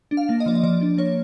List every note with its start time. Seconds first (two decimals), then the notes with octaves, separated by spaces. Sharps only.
0.11 D4
0.17 F5
0.29 A#3
0.40 D#5
0.46 F3 D5
0.55 D#5
0.63 F3 D5
0.81 D4
0.98 A#3 C#5